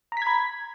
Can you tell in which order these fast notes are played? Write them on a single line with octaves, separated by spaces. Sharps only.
A#5 B6 G#6 B5